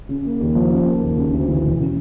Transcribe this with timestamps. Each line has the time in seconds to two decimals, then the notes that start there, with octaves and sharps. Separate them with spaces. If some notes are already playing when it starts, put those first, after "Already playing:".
0.09 C#3
0.25 A#3
0.40 D#2
0.55 F3
0.71 C#3
0.86 A#3
1.01 D#2
1.17 C#3
1.33 D2
1.48 E3
1.64 E1
1.79 C#3